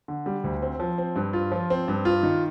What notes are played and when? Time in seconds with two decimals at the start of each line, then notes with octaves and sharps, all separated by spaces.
0.08 D3
0.26 G3
0.44 D2
0.62 C4
0.80 F3
0.98 C4
1.16 G2
1.33 F4
1.52 F3
1.70 C4
1.88 G2
2.05 F4
2.23 D#3